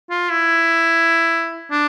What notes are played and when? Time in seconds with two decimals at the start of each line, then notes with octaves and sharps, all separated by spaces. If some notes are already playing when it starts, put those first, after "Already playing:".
0.10 F4
0.31 E4
1.71 D4